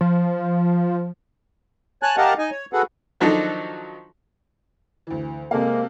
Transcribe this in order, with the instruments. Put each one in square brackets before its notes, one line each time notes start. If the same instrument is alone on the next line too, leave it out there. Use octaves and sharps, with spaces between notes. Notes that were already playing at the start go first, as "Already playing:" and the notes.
[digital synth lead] F3
[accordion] C#5 G#5 A5 F#6
G4 A#4 D#5 F5 F#5 A5
D#4 D#5 G#5
C#5
F#4 G#4 A4 B4 F#5
[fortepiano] D#3 F3 F#3 D4 D#4 A4
[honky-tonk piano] D2 E3
[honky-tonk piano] C3 A4 F5 [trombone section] G#3 A#3